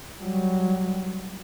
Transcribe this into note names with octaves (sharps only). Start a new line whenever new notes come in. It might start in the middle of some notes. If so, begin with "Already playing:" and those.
F#3 G3